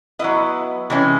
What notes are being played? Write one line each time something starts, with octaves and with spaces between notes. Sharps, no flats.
F#3 B3 E4 D#5
C3 E3 G#3 C#4